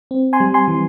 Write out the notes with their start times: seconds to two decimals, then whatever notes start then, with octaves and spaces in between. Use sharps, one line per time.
0.11 C4
0.33 G#5 C6
0.40 G3
0.54 G#5 C6
0.68 E3